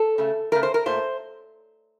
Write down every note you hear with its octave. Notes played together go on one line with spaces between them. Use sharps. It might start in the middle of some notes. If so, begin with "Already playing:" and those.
Already playing: A4
C#3 A3
C#3 A3 A#4
C5
A#4
A#2 A3 C5